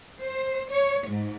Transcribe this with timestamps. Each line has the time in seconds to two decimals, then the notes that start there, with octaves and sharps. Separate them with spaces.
0.21 C5
0.70 C#5
1.08 G#2